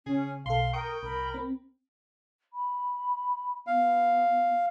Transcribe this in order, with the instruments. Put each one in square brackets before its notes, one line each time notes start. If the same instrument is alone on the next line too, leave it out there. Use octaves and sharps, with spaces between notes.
[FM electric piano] C#3 [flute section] C#4 [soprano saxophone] G#4
[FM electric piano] B1 A4 [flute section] F5 [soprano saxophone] C6
[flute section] A#4 [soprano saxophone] G5 [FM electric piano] C#6 D#6
[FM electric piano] C2 [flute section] A#4 B5
[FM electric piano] C4
[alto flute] B5
[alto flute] B3 [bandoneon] F5